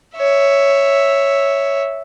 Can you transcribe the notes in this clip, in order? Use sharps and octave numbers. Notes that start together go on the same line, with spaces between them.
C#5 E5